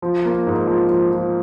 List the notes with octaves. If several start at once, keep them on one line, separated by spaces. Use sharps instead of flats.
F3
A#3
G#2
F3
F3
F3